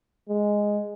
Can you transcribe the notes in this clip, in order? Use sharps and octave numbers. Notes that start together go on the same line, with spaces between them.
G#3